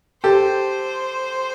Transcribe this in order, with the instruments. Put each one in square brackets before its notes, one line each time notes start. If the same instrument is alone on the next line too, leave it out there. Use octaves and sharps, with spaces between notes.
[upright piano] G4 A4 [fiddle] C5